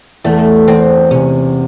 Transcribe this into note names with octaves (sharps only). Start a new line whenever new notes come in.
E2 A3
E2 C4
C3 C#4